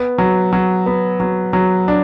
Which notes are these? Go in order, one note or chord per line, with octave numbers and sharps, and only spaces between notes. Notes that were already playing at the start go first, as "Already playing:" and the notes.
Already playing: B3
F#3
F#3
B3
F#3
F#3
D4